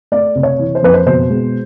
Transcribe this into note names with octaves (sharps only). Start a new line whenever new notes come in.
A3 D5
C3
C#5
E3
C5
F2 B4
C5
B2 C5
G#3